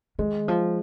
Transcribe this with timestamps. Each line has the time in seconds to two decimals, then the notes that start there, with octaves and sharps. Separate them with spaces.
0.19 D#3 G#3
0.48 F3